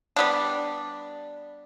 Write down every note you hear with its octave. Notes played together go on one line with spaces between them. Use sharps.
G3 B3 D4